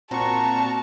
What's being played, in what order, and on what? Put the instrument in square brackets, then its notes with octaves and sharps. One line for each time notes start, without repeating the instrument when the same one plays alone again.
[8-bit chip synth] A#2 C#6 [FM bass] C4 [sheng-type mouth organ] F#4 A#5 [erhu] A5